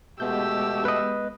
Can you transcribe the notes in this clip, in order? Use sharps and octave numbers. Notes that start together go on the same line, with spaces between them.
B2 G#3 A3 B3 G4 E6 G6
B4 D#5